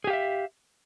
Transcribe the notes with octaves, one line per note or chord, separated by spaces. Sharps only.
G4 G#4 E5 F5